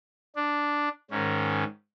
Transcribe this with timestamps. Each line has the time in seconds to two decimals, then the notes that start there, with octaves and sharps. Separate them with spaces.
0.36 D4
1.11 G#2 D#3 C#4